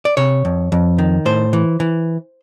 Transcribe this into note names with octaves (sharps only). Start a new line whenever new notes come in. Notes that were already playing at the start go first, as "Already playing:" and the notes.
D5
C3 C#5
F2
F2
D#3
A2 C5
E3
E3